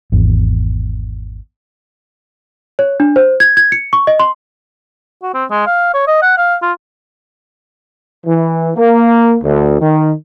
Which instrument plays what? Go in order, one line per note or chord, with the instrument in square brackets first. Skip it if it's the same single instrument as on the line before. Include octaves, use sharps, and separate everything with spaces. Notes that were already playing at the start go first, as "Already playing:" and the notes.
[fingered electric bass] G#1 E2
[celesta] C#5
D4
C5
G#6
G#6
C#7
C#6
D#5
C6
[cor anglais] F#4
C4
G#3
F5
C#5
D#5
F#5
F5
F4
[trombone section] E3
A#3
D2
D#3